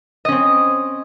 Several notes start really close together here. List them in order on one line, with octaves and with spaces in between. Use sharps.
D#5 C#4 C4